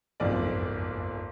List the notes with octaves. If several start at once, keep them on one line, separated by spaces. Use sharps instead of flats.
F#1 B1 F2 G#2 D5